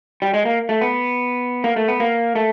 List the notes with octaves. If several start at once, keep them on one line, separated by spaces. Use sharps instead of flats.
G3
G#3
A#3
A3
B3
A#3
A3
B3
A#3
A3